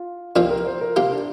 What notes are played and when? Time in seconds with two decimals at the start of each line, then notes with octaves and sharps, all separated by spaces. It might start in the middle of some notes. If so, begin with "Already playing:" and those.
Already playing: F4
0.36 C2 A#2 F3 C4 F4 G4
0.50 A#4
0.67 C5
0.81 A#4
0.96 C3 A#3 F4 G4
1.12 D4